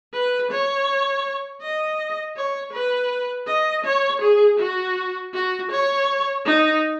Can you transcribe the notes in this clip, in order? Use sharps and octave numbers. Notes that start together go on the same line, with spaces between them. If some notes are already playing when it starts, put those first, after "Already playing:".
B4
C#5
D#5
C#5
B4
D#5
C#5
G#4
F#4
F#4
C#5
D#4